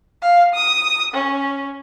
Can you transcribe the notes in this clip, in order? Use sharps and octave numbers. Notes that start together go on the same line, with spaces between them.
F5
D#6
C#4